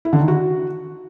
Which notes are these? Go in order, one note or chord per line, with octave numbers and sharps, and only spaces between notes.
E4
D3
D#3
F#4